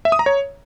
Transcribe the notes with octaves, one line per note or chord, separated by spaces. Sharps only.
E5
D#6
A#5
C#5